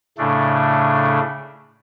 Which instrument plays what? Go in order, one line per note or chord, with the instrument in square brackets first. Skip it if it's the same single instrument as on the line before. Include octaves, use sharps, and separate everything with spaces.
[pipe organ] A2 C#3 A3 D4